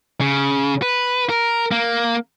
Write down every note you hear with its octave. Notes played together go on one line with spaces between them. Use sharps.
C#3
B4
A#4
A#3